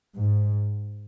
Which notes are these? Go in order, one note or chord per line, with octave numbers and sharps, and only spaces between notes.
G#2